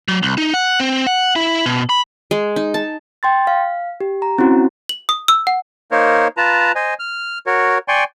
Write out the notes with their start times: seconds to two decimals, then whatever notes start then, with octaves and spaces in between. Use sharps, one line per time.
0.08 F#3
0.23 C2
0.38 D#4
0.54 F#5
0.80 C4
1.07 F#5
1.36 E4
1.66 B2
1.89 B5
2.31 G#3
2.56 D#4
2.74 A5
3.23 G5 C6 A6
3.47 F5
4.01 G4
4.22 A#5
4.38 C4 C#4 E4 F#4
4.89 F#7
5.09 D#6
5.28 E6
5.47 F#5
5.91 A#3 D#4 A#4 C5 C#5
6.37 F4 B4 A5 A#5
6.75 C5 D#5 G#5
6.99 F6
7.46 F#4 A#4 C#5
7.88 D5 G5 G#5 C6 C#6